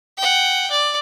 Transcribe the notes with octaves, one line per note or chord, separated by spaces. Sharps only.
F#5 G5
D5